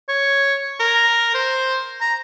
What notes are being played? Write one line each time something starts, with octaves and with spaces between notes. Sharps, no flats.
C#5
A#4
C5
A#5